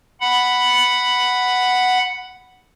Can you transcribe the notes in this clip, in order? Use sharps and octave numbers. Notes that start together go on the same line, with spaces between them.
F#5 B5